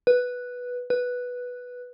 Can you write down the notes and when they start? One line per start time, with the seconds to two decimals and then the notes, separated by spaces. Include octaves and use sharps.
0.07 B4
0.90 B4